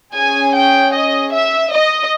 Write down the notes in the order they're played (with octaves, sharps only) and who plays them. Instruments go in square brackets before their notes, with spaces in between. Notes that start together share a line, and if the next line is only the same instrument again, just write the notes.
[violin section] C#4 G#4 G#5
G5
D#5
E5
D#5